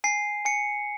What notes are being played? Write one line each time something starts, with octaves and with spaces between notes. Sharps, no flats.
G#5 C7
G#5 C#7